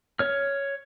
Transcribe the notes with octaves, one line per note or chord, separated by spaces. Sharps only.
C#5 F6